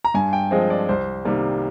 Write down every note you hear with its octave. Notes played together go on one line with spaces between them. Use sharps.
A#5
G2 G#5
G5
F3 G#3 C4 D#5
D5
C2 C5
C3 D#3 G3 A#3